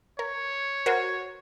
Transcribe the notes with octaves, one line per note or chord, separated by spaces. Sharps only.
A#4 C#5
F#4 A#4 C5